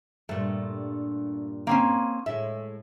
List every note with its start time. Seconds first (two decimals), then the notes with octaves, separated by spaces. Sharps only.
0.29 G2 A#2 A3
1.67 A#3 C4 C#4
2.26 A2 G#3 E5